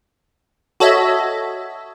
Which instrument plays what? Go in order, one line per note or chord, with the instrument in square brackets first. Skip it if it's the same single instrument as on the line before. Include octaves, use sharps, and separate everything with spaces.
[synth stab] F#4 A4 C#5 D#5 E5